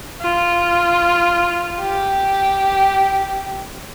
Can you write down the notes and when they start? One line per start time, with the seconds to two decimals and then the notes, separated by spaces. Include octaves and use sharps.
0.21 F4
1.80 G4